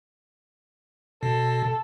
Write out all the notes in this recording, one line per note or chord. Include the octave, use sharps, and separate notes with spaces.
B2 A4